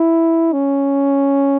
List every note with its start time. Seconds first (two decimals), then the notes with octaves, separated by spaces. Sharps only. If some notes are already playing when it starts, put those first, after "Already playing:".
Already playing: E4
0.53 C#4